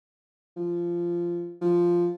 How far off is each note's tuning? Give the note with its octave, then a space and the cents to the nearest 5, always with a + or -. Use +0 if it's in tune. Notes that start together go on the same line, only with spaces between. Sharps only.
F3 -15
F3 -5